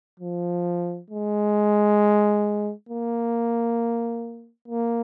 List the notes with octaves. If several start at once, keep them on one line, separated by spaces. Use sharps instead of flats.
F3
G#3
A#3
A#3